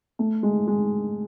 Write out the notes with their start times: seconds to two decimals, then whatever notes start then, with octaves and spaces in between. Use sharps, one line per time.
0.19 A3
0.43 G#3
0.68 G#3